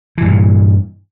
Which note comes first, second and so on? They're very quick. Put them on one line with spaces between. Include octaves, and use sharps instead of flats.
E3 G2 A#2